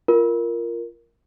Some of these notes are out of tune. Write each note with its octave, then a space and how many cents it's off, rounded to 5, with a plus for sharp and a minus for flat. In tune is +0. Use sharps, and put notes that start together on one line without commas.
F4 -15 A#4 +0